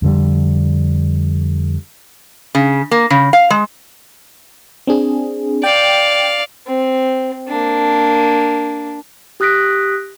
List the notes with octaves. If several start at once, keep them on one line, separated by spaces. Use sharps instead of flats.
F2 D3 G3
C#3
A#3
C#3
F5
G#3
C4 D4 G#4
D5 F5 G5
C4
A#3 D4
G4 D#6 F#6 A#6 B6 D7